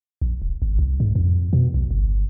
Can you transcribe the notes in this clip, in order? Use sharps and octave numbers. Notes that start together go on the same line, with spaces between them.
A#1
D1
G#1
C2
G#2
F2
B2
B1
G1